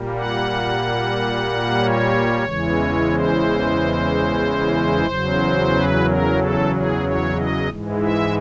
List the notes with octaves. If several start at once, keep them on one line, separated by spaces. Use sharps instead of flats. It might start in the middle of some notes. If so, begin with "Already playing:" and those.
Already playing: A#2 G3 A#3
F#5
C#5
E2 C#3 E3 G#3
C5
E2 C#3 F#3
B4
A#4
A4
G#4
C#5
D#5
G#2 E3 G#3
E5